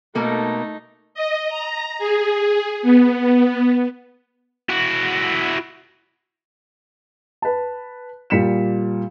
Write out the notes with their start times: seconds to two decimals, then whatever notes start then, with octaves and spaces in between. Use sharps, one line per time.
0.15 B2 A3 A#3 D#4 A4
1.14 D#5
1.49 A#5
1.99 G#4
2.82 B3
4.69 E4 F#4
7.42 B4 A5
8.30 A#2 G3 B6 C#7 E7